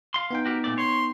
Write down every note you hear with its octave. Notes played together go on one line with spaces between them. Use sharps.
F5 C6
B3 D#4 G5
F#4 G4 A#4
A#2 A3 D5
C#5 C6